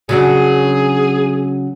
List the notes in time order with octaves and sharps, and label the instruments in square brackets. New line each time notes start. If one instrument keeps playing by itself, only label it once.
[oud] C#3 F#3 D4 [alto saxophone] G#4